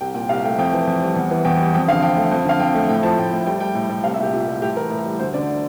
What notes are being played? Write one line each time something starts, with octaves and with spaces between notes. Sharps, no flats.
C2 G5
A#2 G5
C2 F5
A3 G5
F2 G5
E3
F2
G3
E2
E3
E2 G5
G3
F2 G5
D3 F5
F2 G5
A3
F2
D3 F5
F2 G5
A3
A2 G5
F3 A5
A2 G5
A3
G3 G5
G3 G5
A2
A2
C2 F5
E5
A#2 G4
C2 F4
G3
A2 G4
E3 A#4
A2
G3
D2 C5
D3 D5